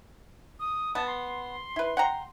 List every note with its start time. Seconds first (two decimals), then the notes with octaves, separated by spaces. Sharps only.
0.59 D#6
0.95 B3 A5
1.07 C6
1.76 E4 B4
1.97 F#5 G5 A#5